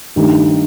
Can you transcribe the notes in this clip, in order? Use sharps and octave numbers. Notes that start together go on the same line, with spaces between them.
G2 D#3 A3 D#4 G4